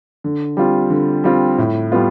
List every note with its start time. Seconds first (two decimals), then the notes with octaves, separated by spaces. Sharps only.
0.24 D3
0.57 G3 C4 F4
0.90 D3
1.24 G3 C4 F4
1.58 A2
1.92 G3 B3 F4